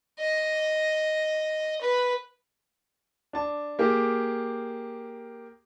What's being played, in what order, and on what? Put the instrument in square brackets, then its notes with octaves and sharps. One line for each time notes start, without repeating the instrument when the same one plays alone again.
[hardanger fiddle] D#5
B4
[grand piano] D4 A5
A#3 G4 G#4